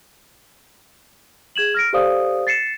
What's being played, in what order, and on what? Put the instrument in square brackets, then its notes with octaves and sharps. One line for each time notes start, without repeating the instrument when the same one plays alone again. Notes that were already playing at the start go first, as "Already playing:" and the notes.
[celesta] G#4 G#6 E7 F#7
F6 A#6 D7
G4 A4 C5 D5 F5 D#6
A6 C7 C#7 E7